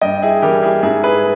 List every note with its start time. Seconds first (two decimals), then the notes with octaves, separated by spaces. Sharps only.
0.01 G2 D#5 G5
0.22 E4 G#4
0.42 E3 G3 G4 A#4
0.63 E4 G#4
0.83 G#2 E4 G#4
1.03 G#4 B4